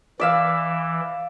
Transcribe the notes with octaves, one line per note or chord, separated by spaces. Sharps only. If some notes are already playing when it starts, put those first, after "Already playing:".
E3 D5 E5 F5